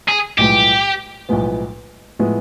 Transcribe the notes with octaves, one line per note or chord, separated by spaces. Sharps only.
G#4
B1 A2 F3 G#3 B3 G4
B1 A2 F3 G#3 B3
A2 F3 G#3 B3